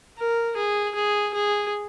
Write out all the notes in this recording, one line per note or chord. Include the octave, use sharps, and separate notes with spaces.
A#4
G#4
G#4
G#4